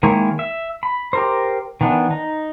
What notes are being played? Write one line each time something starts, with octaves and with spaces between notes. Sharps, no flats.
D#3 G#3 A#3 E4 C#5
E5
B5
G4 A#4 C5
D#3 E3 B3 D4
D#4